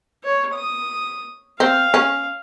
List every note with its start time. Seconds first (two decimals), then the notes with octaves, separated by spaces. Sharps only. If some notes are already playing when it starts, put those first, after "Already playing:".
0.24 C#5
0.54 D#6
1.60 C4 F5
1.94 C#4